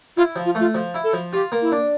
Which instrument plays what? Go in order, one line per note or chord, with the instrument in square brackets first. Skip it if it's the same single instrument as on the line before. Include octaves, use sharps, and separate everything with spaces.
[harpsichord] E4 [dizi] F4
[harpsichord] F3
[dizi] F4
[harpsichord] A3
[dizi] F4
[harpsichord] F3
E4
[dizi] A4
[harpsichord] F3
[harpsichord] F4 [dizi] G4
[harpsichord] A#3
[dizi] E4
[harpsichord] D4